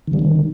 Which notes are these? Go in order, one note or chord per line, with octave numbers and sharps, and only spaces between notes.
D#3
G3
D#3